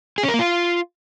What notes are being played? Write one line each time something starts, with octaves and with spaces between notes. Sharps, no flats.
G#4
C#4
A#4
A#3
F4